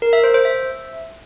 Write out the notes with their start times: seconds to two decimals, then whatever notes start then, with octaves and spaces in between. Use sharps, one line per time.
0.02 A#4
0.13 E5
0.24 C5
0.34 C5
0.45 E5